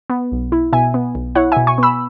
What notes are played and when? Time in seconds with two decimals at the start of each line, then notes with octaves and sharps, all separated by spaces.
0.10 B3
0.32 B1
0.52 E4
0.73 B2 E5 G#5
0.94 B3
1.15 B1
1.35 E4 C#5 F#5
1.52 E5 G#5
1.57 B2
1.67 G#5 C#6
1.78 B3 B5 E6